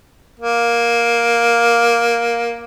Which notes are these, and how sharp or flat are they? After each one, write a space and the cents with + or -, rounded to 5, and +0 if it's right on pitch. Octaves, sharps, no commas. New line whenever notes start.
A#3 +10